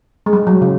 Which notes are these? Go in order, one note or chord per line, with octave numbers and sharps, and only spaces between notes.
G#3
G3
F#3
C#3